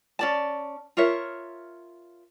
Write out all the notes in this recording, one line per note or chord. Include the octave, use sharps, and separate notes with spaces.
C#4 D5 A5
F4 A#4 C#5 E5